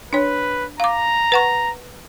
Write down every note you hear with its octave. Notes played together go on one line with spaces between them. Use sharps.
D4 B4 C#5
F5 A#5 D6
B4 F#5 C#6